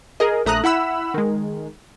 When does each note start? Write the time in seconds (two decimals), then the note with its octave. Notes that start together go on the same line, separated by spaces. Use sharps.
0.20 G#4 A#4 D#5
0.45 A#1 A3 A#5 D#6 F#6
0.64 E4 F#5 B5 E6
1.14 D#3 G#3